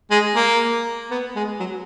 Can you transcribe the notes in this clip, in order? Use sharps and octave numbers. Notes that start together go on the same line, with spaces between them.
G#3
A#3
B3
G#3
F#3